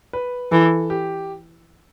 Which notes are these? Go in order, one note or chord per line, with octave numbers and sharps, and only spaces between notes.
B4
E3 A4
G4